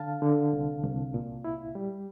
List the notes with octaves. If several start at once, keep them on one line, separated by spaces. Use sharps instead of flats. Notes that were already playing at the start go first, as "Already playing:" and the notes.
Already playing: D3 F5 A5
D3
C2
C2
A#2
E4
G3